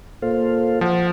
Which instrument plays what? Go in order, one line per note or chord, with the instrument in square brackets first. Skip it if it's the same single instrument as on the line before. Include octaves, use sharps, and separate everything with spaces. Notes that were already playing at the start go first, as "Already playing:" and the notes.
[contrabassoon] A#2 [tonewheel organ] A4 C5 F5
[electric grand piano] F3 [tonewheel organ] F#5